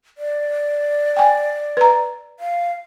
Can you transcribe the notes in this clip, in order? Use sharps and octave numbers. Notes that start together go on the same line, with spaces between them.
D5
G5 G#5
B4 A#5
F5